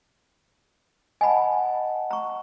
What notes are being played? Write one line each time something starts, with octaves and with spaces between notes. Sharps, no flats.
D#5 F#5 G#5 A5 B5
A#5 C#6